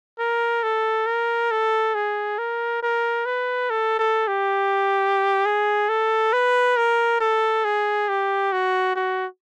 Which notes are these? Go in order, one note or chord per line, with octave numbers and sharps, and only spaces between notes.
A#4
A4
A#4
A4
G#4
A#4
A#4
B4
A4
A4
G4
G#4
A4
B4
A#4
A4
G#4
G4
F#4
F#4